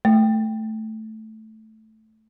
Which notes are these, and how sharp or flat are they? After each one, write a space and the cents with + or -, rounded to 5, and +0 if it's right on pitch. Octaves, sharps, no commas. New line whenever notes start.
A3 -5